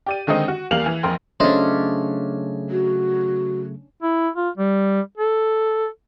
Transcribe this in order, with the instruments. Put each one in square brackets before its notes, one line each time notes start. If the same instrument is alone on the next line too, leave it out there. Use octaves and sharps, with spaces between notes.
[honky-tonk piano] G4 D5 D#7
D3 D#3 G#3 C4 D#4
F#4
E2 G3 A#3 F5 F7 F#7
E3
A#1 F2 A#4 G5 C6
[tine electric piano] C#3 F#3 A3 [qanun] C#4 D4 [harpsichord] C5 D#5
[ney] F#4
[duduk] E4
F4
G3
A4